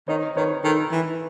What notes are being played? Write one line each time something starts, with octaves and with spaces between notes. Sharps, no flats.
D#3 C#5 D#5
D#3 B4 C#5
D#3 A4 B4
E3